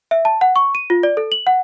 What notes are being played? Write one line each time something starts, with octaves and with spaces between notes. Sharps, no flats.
E5
A5
F#5
C#6
D#7
F4
D5
A4
F#7
F#5